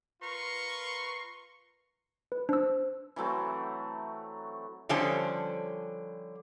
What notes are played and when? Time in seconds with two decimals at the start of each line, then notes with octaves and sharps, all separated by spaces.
0.23 F4 A#4 B4 A#5 C6 C#6
2.32 B4
2.49 D4 C5 E6
3.16 E3 F#3 A3 C4
4.89 D3 F3 G3 C#4 C5 A5